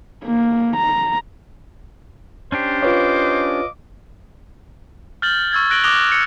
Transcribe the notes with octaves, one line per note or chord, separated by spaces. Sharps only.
A#3
A#5
C#4 D4 G4 C5
F4 B4 C#5 D#5 F5 D6
F6 G6 A6 F#7 G7
C#6 E6 G#6 A6
F#6 A#6 D7 F#7 G7
D6 D#6 F#6 A#6 F7 G7
C#7